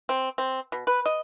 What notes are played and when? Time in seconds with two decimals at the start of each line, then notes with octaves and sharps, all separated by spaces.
0.09 C4
0.38 C4
0.72 B2
0.87 B4
1.06 D#5